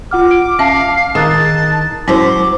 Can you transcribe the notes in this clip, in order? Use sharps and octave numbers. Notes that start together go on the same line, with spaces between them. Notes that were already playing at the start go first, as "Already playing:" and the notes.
F4 F#5 D6 F6
D7
C#4 E5 F5 A5 D6
D#3 G#4 A5 D#6 F#6
F#3 C#4 E4 C5 D6